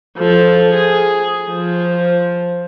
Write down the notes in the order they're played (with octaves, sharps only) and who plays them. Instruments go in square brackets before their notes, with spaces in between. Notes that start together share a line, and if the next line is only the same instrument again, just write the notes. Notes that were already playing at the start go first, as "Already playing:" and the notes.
[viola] F3 A4
G#4
F3